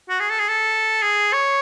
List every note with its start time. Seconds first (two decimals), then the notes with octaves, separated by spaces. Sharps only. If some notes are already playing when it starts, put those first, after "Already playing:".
0.09 F#4
0.20 G#4
0.30 A4
0.40 G#4
0.49 A4
1.02 G#4
1.33 C#5